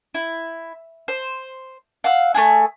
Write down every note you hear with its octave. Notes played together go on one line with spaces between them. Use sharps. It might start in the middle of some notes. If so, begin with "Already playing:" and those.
E4
C5
F5 F#5 E6
A3 D4 G#4